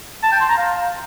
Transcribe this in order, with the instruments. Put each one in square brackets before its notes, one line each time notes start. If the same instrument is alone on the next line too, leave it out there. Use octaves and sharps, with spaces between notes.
[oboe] A5
G5
C6
A#5
F5